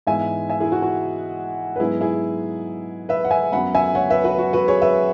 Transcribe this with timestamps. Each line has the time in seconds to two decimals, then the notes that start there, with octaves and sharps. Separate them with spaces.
0.07 G#2 E3 G#3 B3 E5 G#5
0.50 E5 G#5
0.60 E4 G#4
0.72 F#4
0.82 F#4
1.76 B4
1.80 G#2 F#3 B3 E4 G#4
2.01 E4 G#4
3.09 B4 E5
3.24 F#5
3.31 E5 G#5
3.52 F#2 F#3 B3 F#5 B5
3.75 E5 G#5
3.95 C#5 F#5
4.10 B4 E5
4.24 F#4 B4
4.39 F#4
4.53 F#4 B4
4.68 G#4 C#5
4.82 B4 E5